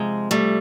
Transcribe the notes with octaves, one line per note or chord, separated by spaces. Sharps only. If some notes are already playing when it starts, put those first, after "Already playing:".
Already playing: C3 F3 G#3
G3 A3